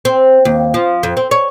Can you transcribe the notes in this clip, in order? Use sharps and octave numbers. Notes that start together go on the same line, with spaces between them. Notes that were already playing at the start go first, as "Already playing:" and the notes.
C4
D#2
F3
F2
C4
C#5